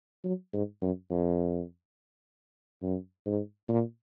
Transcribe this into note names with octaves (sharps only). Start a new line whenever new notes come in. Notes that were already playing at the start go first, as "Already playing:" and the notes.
F#3
G#2
F#2
F2
F#2
G#2
A#2